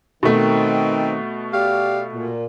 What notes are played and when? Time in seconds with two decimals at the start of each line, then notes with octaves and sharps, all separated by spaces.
0.23 B2 D#3 A3 C4
1.53 G4 D5 F5
2.13 A#2